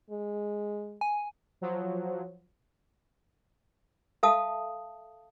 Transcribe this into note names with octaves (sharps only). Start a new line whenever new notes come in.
G#3
G#5
F3 F#3
A4 E5 F5 A5 D#6